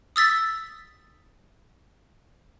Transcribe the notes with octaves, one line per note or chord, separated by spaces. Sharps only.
D#6 E6 A6 B6